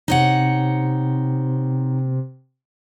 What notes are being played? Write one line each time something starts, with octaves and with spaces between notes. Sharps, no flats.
C3 D#4 C#5 F#5